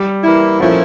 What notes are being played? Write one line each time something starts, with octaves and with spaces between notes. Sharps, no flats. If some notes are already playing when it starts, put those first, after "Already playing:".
Already playing: G3
E3 A#3 E4
A#2 F3 A3 C#4 E4